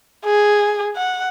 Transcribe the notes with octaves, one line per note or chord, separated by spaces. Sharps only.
G#4
F#5